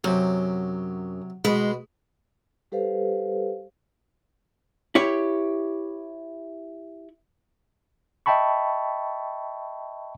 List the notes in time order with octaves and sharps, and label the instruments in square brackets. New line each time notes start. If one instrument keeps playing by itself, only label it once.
[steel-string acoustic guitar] F#2 [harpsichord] C3 F#3
[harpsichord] B2 B4 [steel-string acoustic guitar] G#3
[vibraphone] G3 G4 A4 B4 C5 F5
[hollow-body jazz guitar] E4 G4 C#5
[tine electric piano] D#5 E5 G5 A5 B5 C#6